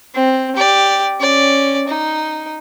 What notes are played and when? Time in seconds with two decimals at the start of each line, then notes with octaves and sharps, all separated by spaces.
0.14 C4
0.56 G4 D5
1.20 C#4 D5
1.88 D#4